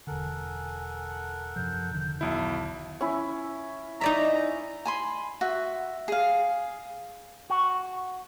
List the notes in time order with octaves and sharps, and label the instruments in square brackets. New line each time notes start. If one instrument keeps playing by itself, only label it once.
[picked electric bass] E1 D3 [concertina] A4 A#4 F#5 [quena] G#5
[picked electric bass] F#2 C3 F3 [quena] G6
[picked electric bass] E1 D3 D#3
[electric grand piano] B1 E4 [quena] A5
[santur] C#4 E4
[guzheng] D#4 D5 E5 [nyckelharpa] A#5
[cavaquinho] G#5 B5 C6
F#4 E5
G#4 F5
[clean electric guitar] F#4